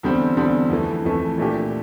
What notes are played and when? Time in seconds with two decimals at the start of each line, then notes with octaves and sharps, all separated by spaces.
0.03 E2 D3 G3 C4
0.37 E2 D3 G3 C4
0.70 F2 E3 A3
1.05 F2 E3 A3
1.38 A#2 A3 D4 G4